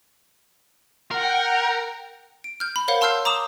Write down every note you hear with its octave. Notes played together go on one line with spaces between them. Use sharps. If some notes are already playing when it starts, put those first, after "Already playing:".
A#4 F#5 G5
D7
F6 G6
B5
A#4 C5 C#5 F5 F#5
A5 C6 E6 F6 G6 C7
A#5 D6 D#6 E7